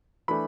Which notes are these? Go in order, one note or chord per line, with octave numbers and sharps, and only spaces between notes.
E3 A3 D4 B5